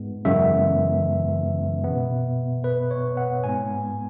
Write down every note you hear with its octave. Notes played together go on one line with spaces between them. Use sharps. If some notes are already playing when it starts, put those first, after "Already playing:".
Already playing: G#2 G#3 B3
F#2 C#3 E3 G#3 B3 E5
B2 B3
B4
C#5
F#5
G#2 G#3 B3 G#5